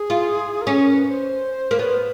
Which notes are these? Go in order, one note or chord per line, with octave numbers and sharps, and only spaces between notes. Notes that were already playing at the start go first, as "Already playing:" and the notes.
Already playing: G#4
F4
A#4
C#4 A4
A#4
B4
C5
A#3
B3 C#5
C5